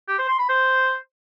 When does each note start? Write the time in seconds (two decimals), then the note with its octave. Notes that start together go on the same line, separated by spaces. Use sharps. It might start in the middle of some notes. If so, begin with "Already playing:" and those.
0.08 G4
0.18 C5
0.29 C6
0.39 B5
0.49 C5